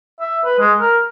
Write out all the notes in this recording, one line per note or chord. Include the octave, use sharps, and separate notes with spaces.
E5
B4
G#3
A#4